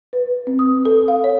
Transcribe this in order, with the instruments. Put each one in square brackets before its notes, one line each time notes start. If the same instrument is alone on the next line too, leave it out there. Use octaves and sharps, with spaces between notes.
[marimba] B4
C4
D#6
A4
F5
C#5